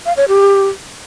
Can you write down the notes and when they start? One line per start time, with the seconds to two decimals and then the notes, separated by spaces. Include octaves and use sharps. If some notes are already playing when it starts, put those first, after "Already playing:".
0.06 F5
0.17 C#5
0.28 G4